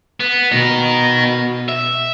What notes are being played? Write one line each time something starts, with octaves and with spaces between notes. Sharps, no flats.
B3
B2 D#4 A#4
E5